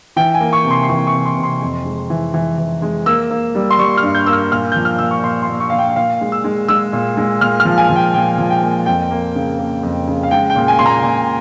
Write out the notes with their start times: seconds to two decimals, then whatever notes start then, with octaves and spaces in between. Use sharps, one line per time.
0.16 E3 G5
0.34 G#5
0.40 A#3
0.53 C#6
0.64 C3
0.71 C6
0.83 C6
0.89 E3 C#6
1.07 C#6
1.14 C3
1.25 C6
1.37 C3
1.43 C6
1.62 F2
1.85 G#3
2.10 E3
2.34 E3
2.58 E3
2.82 G#3
3.06 A#3 E6
3.31 A#3
3.55 G3
3.71 C6
3.79 G3 C#6
3.98 F6
4.03 G2
4.15 G6
4.26 A#3 E6
4.33 F6
4.52 A#2 F6
4.72 F3 G6
4.85 F6
4.98 A#2 E6
5.11 C#6
5.23 A#2 C6
5.43 A#2 C6
5.60 C#6
5.70 A#2 F5
5.79 G5
5.96 A#2 F5
6.21 G#3
6.32 E6
6.44 G#3
6.68 G#3 E6
6.93 A#2
7.17 G#3
7.41 A#2 F6
7.60 F6
7.65 F3
7.78 G#5
7.90 F3
7.96 G5
8.14 A#2 G5
8.38 F3
8.50 G5
8.62 A#3
8.86 F2 G5
9.11 A#3
9.35 C#3
9.59 A#3
9.83 F2
10.08 C#3
10.23 F5
10.31 G#3 G5
10.50 G5
10.56 A#2
10.68 G#5
10.79 A#2 C6
10.86 A#5
11.04 A#2